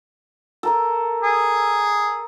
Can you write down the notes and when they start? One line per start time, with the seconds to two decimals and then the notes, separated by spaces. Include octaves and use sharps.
0.63 A4 A#4 A#5
1.23 G#4